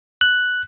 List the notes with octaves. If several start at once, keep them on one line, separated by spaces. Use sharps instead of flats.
F#6